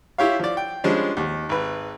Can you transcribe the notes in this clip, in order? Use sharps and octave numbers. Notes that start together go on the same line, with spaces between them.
E4 F4 G4 C#5 F5
F3 D5
G5
F3 G3 G#3 C#4 D4
D#2
G#1 B4